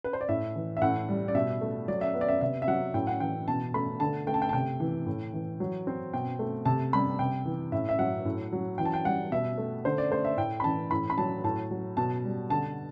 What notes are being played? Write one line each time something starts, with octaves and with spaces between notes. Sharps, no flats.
B4
C5
D5
A2 E5
E3
E5
A2 F#5
G3
D5
B2 E5
A3
F#3 D5
E5
B3
D5
E5
C3 E5
E5
F#3 F#5
A2 G5
F#5
E3 G5
B2 A5
A3 B5
D3 A5
A3 G5
A5
G5
A5
C3 G5
E3
A2
E3
F#3
C4
B2 G5
A3
C3 A5
G3 B5
C3 G5
E3
A2 E5
E5
F#3 F#5
A2
F#3
E3 G5
A5
G5
G3 F#5
B2 E5
A3
D3 C5
D5
A3 C5
E5
A2 G5
B5
E3 A5
A2 B5
B5
F#3 A5
A2 A5
F#3
B2 A5
G3
D3 A5